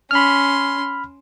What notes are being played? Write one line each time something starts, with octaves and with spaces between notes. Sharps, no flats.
C#4 B5 C6 F6